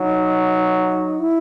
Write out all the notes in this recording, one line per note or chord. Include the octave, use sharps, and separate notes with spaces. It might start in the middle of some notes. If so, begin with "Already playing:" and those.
Already playing: F#3 D#4
E4